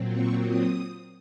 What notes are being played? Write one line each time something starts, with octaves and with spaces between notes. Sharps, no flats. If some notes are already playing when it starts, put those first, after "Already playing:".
Already playing: A#2 F#3 C4
C#6
D#6